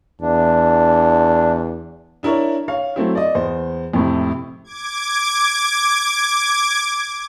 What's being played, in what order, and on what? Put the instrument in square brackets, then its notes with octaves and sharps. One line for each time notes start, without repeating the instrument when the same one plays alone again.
[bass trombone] E2 [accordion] D4
[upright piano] D4 E4 A#4 C#5
C#5 F5
F#3 A3 C4 E4
D5 D#5
E2 C5
F2 A2 C3
[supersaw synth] D6 G#6